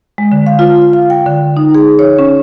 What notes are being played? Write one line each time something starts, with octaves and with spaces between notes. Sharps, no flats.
G#3
D3
F5
F4
F5
G5
D3
D#4
G#4
C#5
C#4